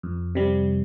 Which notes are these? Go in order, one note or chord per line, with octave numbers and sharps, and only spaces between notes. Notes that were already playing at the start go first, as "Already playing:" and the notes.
F2
C3 G3